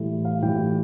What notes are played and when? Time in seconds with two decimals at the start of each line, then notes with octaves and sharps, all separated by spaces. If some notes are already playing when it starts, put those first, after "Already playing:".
Already playing: A2 E3 G3
0.25 F5
0.42 A2 E3 G3 G5